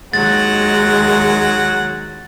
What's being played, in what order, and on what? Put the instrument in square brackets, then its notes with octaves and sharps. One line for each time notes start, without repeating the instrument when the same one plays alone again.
[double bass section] D#2 D#3 [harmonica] F#3 F#5 [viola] G#3 [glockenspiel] A6